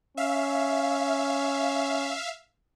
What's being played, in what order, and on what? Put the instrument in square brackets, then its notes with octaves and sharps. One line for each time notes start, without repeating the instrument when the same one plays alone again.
[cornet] C#4 [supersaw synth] E5 F5